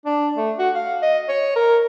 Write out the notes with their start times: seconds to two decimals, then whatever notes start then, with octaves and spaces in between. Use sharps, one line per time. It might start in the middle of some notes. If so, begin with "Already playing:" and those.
0.05 D4
0.37 A3
0.59 F#4
0.75 F5
1.02 D#5
1.29 C#5
1.56 A#4